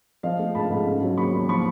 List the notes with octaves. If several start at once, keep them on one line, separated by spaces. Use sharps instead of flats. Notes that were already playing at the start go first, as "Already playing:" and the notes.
F3 D#5 F5
A3
G#2 A5 B5
G#2
C#3
F#3
D#2 B5 C#6
D#2
F3 B5 C#6